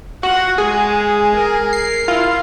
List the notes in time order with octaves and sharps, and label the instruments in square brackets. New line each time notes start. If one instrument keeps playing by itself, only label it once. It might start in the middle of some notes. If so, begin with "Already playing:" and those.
[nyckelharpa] F4 F#5 [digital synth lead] F#4
[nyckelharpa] G#3 [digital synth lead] G#4
[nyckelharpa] A#4
[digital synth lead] C7
[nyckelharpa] E4 [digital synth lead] F4